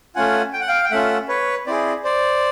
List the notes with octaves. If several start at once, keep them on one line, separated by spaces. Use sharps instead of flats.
A3 C#4 F4 F#5 G#5
G5
F#5
F5 G5
G5
A3 C#4 F4 E5 F#5
B4 C#5
C4 E4 G#4 C5 D5
C5 D5